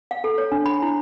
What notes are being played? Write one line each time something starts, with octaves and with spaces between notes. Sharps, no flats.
F5
A4
C#5
D4
B5
E4